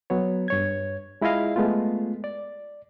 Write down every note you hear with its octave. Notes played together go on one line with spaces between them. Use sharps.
F#3 B3 C#5
G2 C#5 G#6
G#3 E4 F4 G#4 D#5 F5
G#3 A3 B3 F4
D5